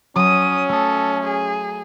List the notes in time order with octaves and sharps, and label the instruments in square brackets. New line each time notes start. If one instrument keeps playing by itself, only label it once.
[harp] F#3 [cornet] C#4 [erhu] D#6
[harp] A3 D#6 [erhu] A4
[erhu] G#4